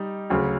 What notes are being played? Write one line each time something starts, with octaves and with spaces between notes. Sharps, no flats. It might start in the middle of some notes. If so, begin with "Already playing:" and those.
Already playing: G3 D#4
D2 C#3 F#3